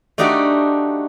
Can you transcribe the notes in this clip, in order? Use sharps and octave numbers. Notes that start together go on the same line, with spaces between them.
A3 D4 D#4 F#4 G4 D5